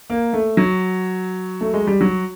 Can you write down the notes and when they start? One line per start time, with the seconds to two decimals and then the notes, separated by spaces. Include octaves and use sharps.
0.10 A#3
0.33 A3
0.57 F#3
1.61 A3
1.74 G#3
1.87 G3
2.01 F#3